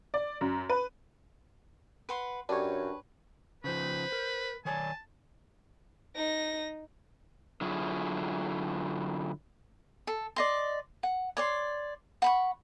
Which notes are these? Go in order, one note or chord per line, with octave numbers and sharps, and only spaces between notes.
D5
F#2
B4
B4 F#5 C6
F#2 D4 G4 B4 C#5
C#3 F3 B4 C5
A#4
D#3 C#5 D5 G#5 A5
D#4 A#6
D3 F#3 E4 F4 G#4
A4
D5 D#5 C6
F#5
C#5 D5 C6
F#5 B5 C#6